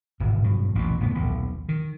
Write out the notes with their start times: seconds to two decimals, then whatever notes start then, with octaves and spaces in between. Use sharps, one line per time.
0.20 D1 G#1 B2
0.44 G2 B2 F#3
0.75 A1 D#2 B2
1.00 F#1 A2 B3
1.15 D#1 B1
1.69 D#3